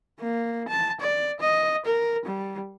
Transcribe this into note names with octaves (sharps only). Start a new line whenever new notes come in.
A#3
A5
D5
D#5
A#4
G3